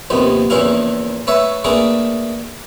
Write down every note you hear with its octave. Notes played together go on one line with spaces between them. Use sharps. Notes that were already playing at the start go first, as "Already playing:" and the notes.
A#1 D#2 C3 B3
A#1 E2 C#3 E3 E4 F5
A3 B4 C#5 E5
A3 A#3 D4 G#4 B4